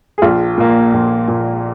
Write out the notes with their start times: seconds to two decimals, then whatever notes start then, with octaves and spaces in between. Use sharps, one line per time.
0.18 G#4
0.22 A#1 F4
0.58 A#2 A#3
0.93 A#1
1.28 A#2 A#3